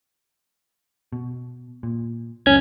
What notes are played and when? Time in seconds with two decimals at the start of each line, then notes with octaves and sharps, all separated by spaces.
1.13 B2
1.83 A#2
2.46 C#2 F#2 C#4 G#6